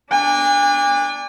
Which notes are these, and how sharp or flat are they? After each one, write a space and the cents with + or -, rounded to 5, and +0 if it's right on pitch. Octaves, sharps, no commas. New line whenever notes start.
D4 -10 G#5 -40